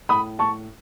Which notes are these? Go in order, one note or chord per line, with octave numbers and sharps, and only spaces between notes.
A2 B5 D#6
A2 A5 C#6